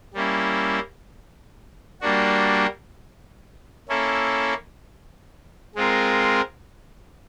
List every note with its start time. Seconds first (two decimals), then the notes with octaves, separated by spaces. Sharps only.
0.14 G3 A#3 C#4 E4
2.01 G3 A#3 D4 F#4
3.89 A#3 C#4 E4 A4
5.75 G#3 C4 F4 A#4